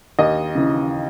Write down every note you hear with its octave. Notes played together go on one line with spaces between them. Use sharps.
D#2 D#5
C#3 E3